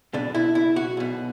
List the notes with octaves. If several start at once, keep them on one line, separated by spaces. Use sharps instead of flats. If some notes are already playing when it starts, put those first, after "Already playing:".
B1 B2 D4
E4
E4
F#4
B1 B2